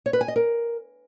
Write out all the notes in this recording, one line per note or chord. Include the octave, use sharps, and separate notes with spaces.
C#5
B4
G#5
D#5
A#4